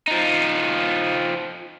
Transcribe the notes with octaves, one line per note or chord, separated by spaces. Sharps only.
F3 D#4